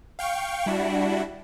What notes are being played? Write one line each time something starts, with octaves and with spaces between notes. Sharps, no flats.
F5 G5 C#6
G3 D4 E4 F#4